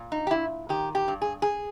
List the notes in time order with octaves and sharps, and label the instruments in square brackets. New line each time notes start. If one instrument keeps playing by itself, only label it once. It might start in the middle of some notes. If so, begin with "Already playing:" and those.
Already playing: [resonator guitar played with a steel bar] A#2
D#4
G4
A#2 E4
D#3 G4
G4
G2
G#4
G#4